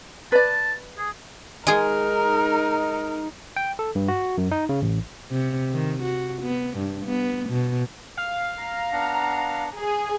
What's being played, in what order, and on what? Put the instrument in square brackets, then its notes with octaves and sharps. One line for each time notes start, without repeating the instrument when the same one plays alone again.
[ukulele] B4 D5 [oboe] A5
[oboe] G#4
[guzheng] G#3 G#4 [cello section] D#4 [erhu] A#4
[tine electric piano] G5
A4
G2
F#4
F#2
D#4
C#3
A1
[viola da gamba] C3
D#3
F#4
B3
G2
B3
B2
[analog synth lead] F5
[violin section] A#5
[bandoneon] B3 D4 F#5
[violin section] G#4